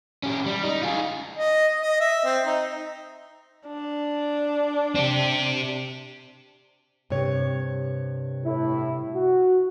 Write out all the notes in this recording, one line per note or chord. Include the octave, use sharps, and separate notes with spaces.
C#4 G4
G3
D#4
F4 G#4
D#5
D#5
E5
C4
D#4
D4
C4 G4
G2 C3 C#5
A2 E4
F#4